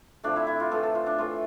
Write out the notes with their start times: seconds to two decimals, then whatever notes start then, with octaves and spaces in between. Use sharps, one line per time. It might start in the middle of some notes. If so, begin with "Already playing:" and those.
0.23 C3 F3 A3 D4
0.36 E4
0.47 E4
0.60 F4
0.71 A2 E3 A3 A4
0.83 A4
0.95 F4
1.06 D4
1.18 A2 E3 A3 F4